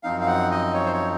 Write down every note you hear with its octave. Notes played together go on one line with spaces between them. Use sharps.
F#2 F3 C4 D#4 F5
F5
F#5
D#5
C#5
C5
C#5